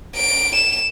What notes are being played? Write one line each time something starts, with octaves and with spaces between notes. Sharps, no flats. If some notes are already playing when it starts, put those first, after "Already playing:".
D7
E7